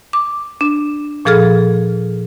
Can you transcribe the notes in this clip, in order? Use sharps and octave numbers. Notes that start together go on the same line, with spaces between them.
D6
D4
A#2 F3 G#4 A4 F6